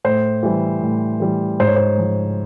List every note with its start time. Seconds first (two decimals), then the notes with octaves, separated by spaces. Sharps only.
0.04 A2 C5
0.43 E3 G3
0.82 A2
1.20 E3 G3
1.60 G#2 C5
1.67 C#5
1.76 C5
1.97 F3 G#3